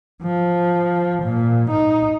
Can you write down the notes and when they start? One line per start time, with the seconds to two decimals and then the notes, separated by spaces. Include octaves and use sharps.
0.23 F3
1.24 A#2
1.71 D#4